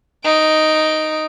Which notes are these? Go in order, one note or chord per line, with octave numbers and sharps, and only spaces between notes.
D#4 D7